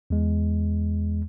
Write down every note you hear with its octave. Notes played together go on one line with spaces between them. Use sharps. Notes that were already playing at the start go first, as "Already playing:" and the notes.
E2 G#3